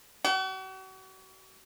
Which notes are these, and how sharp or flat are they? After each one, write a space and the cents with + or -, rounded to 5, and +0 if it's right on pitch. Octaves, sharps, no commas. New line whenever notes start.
F#4 +40